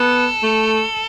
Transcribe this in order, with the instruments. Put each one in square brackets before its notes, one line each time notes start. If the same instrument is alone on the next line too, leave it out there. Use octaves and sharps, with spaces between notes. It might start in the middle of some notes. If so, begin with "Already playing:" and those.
Already playing: [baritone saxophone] B3 [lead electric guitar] A4
[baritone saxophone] A3